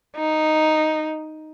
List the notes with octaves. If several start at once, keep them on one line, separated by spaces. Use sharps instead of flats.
D#4